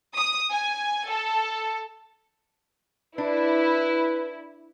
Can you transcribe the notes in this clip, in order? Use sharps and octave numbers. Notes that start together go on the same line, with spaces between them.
D#6
G#5
A4
D4 E4 B4